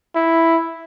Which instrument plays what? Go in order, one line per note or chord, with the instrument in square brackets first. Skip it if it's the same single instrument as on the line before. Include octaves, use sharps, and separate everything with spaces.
[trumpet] E4